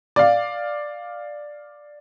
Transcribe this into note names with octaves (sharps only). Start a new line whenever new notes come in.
D5 F5